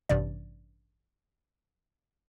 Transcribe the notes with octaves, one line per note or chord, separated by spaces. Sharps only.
A1 G2 C3 D5